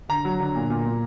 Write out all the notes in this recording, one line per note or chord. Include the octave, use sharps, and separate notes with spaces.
D3 A#5
F#3
D3
A#2
A#2
A#2